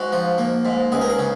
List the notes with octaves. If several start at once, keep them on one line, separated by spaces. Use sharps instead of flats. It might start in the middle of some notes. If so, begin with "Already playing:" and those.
Already playing: G#2 F#4
F3
A#3
G#2
C#2 G#4
A#4
G#4
C#3